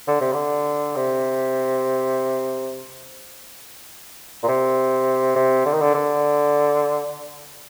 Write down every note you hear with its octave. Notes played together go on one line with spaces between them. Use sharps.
D3
C3
D3
C3
A#2
C3
C3
D3
D#3
D3
D3